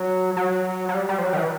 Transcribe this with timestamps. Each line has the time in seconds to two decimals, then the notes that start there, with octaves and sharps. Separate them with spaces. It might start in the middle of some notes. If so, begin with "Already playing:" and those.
Already playing: F#3
0.37 F#3
0.89 F#3
0.94 G3
1.09 G3
1.18 F3
1.23 F#3
1.33 D#3
1.37 E3